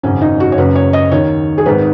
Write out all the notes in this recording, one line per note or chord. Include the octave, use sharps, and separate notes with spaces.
G#1 F#2 C#3 C#4
D#4
F#4
C#5
F#1 F#2 C#3 B4
C#5
D#5
D#2 D#3 C#5
G#4
G#1 G#2 D#3 B4